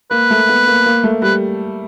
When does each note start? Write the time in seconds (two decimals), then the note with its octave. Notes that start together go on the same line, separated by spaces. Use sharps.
0.11 A#3 B4
0.30 A3
0.49 B3
0.67 A#3
0.86 A#3
1.04 A3
1.22 G3 B4